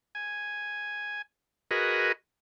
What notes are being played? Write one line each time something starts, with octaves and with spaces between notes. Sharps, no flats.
G#5
F#4 G#4 A#4 B4 D#5